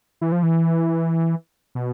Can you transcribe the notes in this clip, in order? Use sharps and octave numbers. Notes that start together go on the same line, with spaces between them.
E3
F3
E3
B2